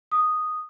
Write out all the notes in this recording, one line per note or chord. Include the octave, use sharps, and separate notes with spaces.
D#6